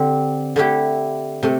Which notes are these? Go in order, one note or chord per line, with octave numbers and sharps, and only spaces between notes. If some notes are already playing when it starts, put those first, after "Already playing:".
Already playing: D3 C4 G4
D3 A3 E4 G4
C3 A3